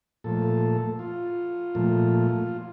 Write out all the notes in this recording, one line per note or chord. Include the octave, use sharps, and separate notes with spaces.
A#2 F3 A3 A4
F4
A#2 F3 A3